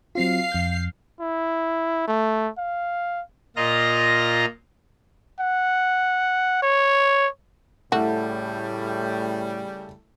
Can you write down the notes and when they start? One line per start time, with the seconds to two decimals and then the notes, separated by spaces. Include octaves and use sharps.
0.15 F#3 C4 F4 F5 C7
0.52 F2 G6
1.21 E4
2.08 A3
2.58 F5
3.56 A#2 F4 D#5 A#5 A#6
5.40 F#5
6.63 C#5
7.92 A2 C#3 G3 A3 E4 F#4